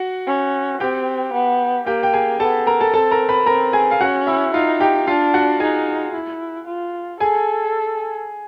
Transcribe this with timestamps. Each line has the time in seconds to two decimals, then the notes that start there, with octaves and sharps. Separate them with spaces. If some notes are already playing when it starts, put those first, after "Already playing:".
Already playing: F#4 F#5
0.27 C#4
0.80 C4 G4 G5
1.33 B3
1.86 A#3 G4 G5
2.03 G5
2.14 G#4 G#5
2.40 B3 A4 A5
2.67 A#4 A#5
2.80 A4 A5
2.94 C4 A4 A5
3.11 A#4 A#5
3.29 B4 B5
3.46 C4 A#4 A#5
3.73 G#4 G#5
3.91 F5
4.01 C#4 F#4 F#5
4.27 E4 E5
4.54 D#4 F4 F5
4.80 G4 G5
5.07 D4 F4 F5
5.34 F#4 F#5
5.60 D#4 G#4 G#5
6.14 E4
6.67 F4
7.20 G#4 A4 G#5